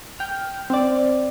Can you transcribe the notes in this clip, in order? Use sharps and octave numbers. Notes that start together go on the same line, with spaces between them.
G5 F6
C4 D5